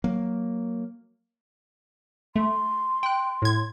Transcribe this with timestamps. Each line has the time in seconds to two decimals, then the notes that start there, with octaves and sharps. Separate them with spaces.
0.04 F#3 A#3
2.36 A3 C6
3.03 G5 F#6
3.42 A2 G#6